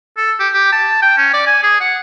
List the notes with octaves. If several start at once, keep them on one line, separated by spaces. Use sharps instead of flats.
A4
G4
G4
A5
G5
C#4
D5
G#5
G#4
F#5